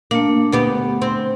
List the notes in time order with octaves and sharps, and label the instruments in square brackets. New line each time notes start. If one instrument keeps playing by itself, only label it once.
[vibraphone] A3 D4 [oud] A#3
[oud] D2 B3 G4 [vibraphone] F#5
[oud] C4